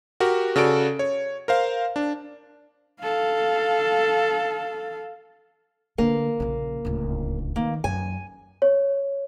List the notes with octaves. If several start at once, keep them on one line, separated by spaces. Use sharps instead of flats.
F#4 G4 A#4
C#3 F#4 A4 D5 D7
C#5
A#4 C5 F5
D4
A4 F5
D3 A#3
A#1 C#3
D1 C#2
D#3 A#3
F#2 G#5
C#5